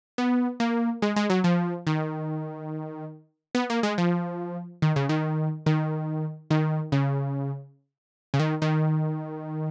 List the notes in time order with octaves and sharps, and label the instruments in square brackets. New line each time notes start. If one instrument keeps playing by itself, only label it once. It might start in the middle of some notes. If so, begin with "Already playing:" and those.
[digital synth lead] B3
A#3
G#3
G#3
F#3
F3
D#3
B3
A#3
G#3
F3
D#3
C#3
D#3
D#3
D#3
C#3
C#3
D#3
D#3